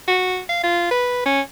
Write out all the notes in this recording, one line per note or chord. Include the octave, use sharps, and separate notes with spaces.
F#4
F5
F4
B4
C#4